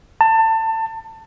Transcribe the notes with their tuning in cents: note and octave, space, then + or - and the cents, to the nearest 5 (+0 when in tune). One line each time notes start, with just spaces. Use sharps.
A5 +25